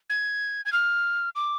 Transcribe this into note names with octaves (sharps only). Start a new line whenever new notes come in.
G#6
G#6
F6
D6